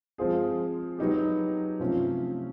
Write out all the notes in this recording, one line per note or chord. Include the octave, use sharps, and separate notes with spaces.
F3 G#3 C4 F4 G#4
F#3 B3 D#4 G4
C3 F3 A3 C#4 F4